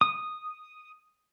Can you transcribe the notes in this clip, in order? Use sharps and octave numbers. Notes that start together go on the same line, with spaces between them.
D#6